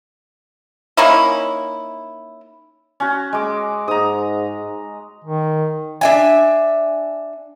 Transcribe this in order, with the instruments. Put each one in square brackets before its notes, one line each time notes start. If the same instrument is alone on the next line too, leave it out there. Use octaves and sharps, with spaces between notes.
[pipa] A#3 C#4 D#4 E4
[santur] C#4 F#4
G#3 D6
[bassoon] G#2 [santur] A#5 D#6
[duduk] D#3
[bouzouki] D4 E5 G#5